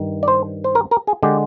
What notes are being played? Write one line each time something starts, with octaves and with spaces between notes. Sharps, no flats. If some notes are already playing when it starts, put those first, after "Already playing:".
Already playing: G2 D#3
D5
C5
C5
A#4
A#4
G#4
D3 G#3 G4